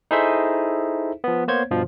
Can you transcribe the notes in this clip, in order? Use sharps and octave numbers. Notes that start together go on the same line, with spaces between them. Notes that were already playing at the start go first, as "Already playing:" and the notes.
D#4 E4 G#4 A4 C5 E5
F3 B3
A#3 B3 C5 C#5 G#6
G2 B2 F3